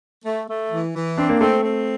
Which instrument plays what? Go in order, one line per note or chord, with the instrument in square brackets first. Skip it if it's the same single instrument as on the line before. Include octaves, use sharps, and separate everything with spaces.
[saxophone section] A3
A3
E3
E3
[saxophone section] C4 [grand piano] D4
[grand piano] A#3
[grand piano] A3 [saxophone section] C4
[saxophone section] C4